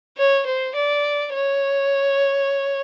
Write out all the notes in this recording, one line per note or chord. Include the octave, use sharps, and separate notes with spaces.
C#5
C5
D5
C#5